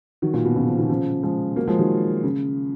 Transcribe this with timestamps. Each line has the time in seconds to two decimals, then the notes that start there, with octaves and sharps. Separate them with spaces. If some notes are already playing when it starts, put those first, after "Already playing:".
0.22 D#3 F#3
0.34 A#2
0.45 B2
0.56 A#2 C#3
0.67 C#3 F3
0.78 B2 D#3
0.89 C#3 F3
1.23 F3 G#3
1.56 F#3 A#3
1.67 F3 G#3
1.79 D#3 F#3
2.23 C#3